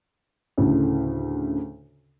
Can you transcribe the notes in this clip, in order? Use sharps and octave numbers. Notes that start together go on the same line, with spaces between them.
D2 A2 C#3